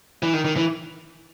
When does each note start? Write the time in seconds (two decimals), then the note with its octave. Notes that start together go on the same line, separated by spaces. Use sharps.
0.23 E3
0.33 D#3
0.45 D#3
0.56 E3